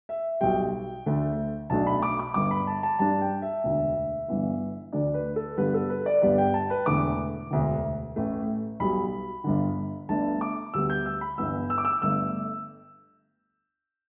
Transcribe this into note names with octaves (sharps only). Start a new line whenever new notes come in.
E5
B1 B2 G3 G5
D2 D3 A3
B1 B2 A3 D4 A5
B5
D6
D6
G1 G2 D3 D6
B5
A5
A5
G2 G3 D4 A5
G5
E5
E1 D2 D3
G1 G2 E3 B3
D2 D3 A3 D4 D5
B4
A4
G2 D3 G3 B3 B4
A4
B4
D5
G1 G2 G3 B3 D5
G5
A5
B4
E1 E2 D3 A3 D6
E1 D2 D3
A1 A2 A3
B1 B2 G3 B5
G1 G2 D3
G1 G2 D3 A3 D4 A5
D6
D2 D3 G3 B3 E6
G6
E6
B5
G1 G2 E3 B3 E6
E6
D6
E6
G1 G2 D3 A3 E6